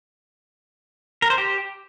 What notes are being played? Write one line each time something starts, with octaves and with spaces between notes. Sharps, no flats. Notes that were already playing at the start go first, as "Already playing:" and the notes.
A#4
C5
G4